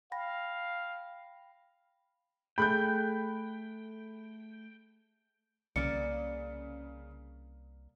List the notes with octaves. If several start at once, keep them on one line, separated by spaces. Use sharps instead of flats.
F5 G5 B5 A#6
A3 G#4 A4 G5 B5 F#6 G6
C2 C#3 A#3 D5 C#7